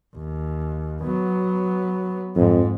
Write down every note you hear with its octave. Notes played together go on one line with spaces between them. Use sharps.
D#2
F#3 B3
F2 G#2